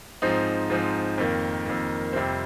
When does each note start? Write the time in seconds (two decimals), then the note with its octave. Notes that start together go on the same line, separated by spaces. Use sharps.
0.22 G#2 F3 C4 D#4
0.70 G#2 F3 C4 D#4
1.18 F2 D#3 A#3
1.66 F2 D#3 A#3
2.13 F2 C3 G3 C4